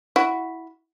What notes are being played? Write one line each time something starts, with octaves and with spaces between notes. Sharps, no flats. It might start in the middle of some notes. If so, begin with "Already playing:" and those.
E4 F#4